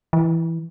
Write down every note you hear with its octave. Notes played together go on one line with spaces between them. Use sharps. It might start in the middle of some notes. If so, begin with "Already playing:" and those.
E3